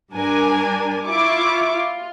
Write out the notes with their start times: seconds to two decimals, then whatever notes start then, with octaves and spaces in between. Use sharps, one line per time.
0.12 G2 D4 A#4 G#5
1.05 E4 F4 C#6 D6
1.74 F4